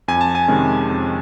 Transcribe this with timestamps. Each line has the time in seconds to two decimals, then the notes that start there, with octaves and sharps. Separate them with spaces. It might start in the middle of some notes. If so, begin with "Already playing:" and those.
0.08 F2 G#5
0.21 A5
0.35 G#5
0.48 C3 D#3 G#3 C#4
0.90 F2